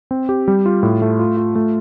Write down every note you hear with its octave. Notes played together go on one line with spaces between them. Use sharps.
C4
G4
G3
F4
A2
A3
F4
F4
A3